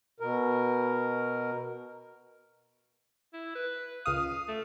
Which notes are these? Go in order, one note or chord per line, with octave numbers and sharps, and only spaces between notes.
B2 A#4
E4
B4
C#2 F5 D#6
A3